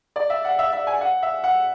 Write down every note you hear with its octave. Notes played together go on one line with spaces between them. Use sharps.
D5
E5
F#5
E5
E5
G#5
F#5
E5
F#5